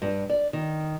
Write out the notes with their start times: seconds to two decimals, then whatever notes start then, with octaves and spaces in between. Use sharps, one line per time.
0.02 G2
0.30 D5
0.53 D#3